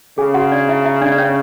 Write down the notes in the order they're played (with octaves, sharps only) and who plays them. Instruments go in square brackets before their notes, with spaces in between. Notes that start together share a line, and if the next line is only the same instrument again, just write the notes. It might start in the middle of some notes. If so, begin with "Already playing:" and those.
[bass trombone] C#3 [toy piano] G#4 G#5
[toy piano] F#4 F#5
D4 D5
E4 E5
E4 E5
D4 D5
D5
C#4 C#5